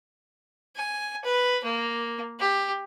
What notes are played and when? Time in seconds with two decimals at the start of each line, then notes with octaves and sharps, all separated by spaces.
0.76 G#5
1.24 B4
1.64 A#3
2.39 G4